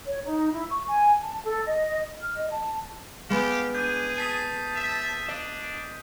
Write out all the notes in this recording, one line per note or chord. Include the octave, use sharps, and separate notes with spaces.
C#5
D#4
E4
C#6
G#5
A5
A4
D#5
F6
D#5
A5
G#3 B3 G4 F5 F#6
D4 G#4 G6 D#7
A5 D#6 B6 C7
E5
D4 D#5